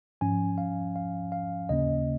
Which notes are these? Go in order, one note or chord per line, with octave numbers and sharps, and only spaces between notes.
G#2 F3 C#4 G#5
F5
F5
F5
D#2 C#3 A#3 C#4 D#5